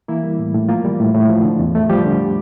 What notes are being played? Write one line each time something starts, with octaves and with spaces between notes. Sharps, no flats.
E3 A#3 E4
G3
A2
A2
F3 A#3 F4
G3
A2
A2
F3
D3
E2
A3
F3 G3 G4
D3